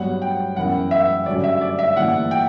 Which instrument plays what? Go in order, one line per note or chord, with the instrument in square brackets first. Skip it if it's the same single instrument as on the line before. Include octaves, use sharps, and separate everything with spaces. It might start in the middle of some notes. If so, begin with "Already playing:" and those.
Already playing: [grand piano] G2 F#3 B3 [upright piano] F#5
[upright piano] G5
[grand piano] F#2 E3 B3 E4 A#4 [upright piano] F#5
[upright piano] E5
[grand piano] G2 D3 F#3 C#4 F#4 [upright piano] D5
[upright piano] E5
D5
E5
[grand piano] G2 E3 A#3 E4 [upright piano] F#5
[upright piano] G5